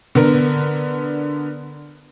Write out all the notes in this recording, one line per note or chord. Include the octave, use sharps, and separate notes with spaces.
D3 B3 A#4